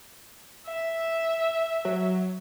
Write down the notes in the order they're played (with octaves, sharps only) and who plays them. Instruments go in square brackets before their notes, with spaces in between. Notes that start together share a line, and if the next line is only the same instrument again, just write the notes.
[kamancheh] E5
[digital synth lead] F#3